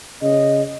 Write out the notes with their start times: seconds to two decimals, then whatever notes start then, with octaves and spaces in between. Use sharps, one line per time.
0.22 C#3 D#5